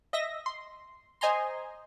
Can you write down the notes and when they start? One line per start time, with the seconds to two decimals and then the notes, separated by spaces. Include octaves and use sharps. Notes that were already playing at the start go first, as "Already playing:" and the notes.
0.13 D#5 E5 A#6
0.46 C6
1.21 C5 D#5 G#5 A#5 C6